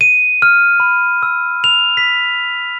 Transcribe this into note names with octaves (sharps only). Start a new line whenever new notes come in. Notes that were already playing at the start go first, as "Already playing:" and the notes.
D#7
F6
B5
E6
F7
B6